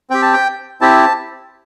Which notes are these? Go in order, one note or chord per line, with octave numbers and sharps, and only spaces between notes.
C4 G4 G5
A5
G5
C4 E4 G4 A5